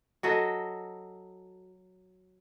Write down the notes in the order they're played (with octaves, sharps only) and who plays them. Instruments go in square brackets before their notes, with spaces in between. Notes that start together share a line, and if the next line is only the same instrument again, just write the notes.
[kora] F#3 F#4 A4 D#5